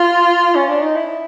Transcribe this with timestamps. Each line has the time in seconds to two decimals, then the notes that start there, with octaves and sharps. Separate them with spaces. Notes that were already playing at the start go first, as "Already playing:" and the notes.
Already playing: F4
0.55 C#4
0.69 D4
0.82 D#4
0.95 E4